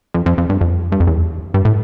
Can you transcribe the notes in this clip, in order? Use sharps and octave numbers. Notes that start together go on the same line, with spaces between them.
F2
F2
F2
G2
F2
G2
F2
E2
G2
A2